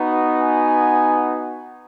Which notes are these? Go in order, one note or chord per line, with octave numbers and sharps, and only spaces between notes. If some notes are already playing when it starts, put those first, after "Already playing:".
Already playing: B3 D#4 F#4
G#5